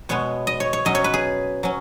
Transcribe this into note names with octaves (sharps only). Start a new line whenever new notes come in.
B2 G#3 B3 C#5
D#5
C#5
C#5
B2 F#3 C#4 D#5
C#5
B4
G#4
F#3 C#4